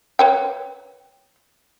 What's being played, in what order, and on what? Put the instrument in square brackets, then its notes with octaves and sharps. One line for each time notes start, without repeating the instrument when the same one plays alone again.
[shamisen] B4 C#5 G5